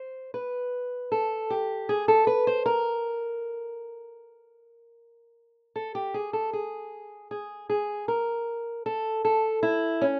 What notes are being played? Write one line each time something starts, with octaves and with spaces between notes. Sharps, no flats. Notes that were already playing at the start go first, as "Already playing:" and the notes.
Already playing: C5
B4
A4
G4
G#4
A4
B4
C5
A#4
A4
G4
G#4
A4
G#4
G#4
G#4
A#4
A4
A4
E4
C#4